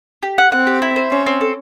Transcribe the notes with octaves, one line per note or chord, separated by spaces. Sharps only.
G4
F#5
C4 F#5
G4
E4
C5
C4 C#4
C4
A4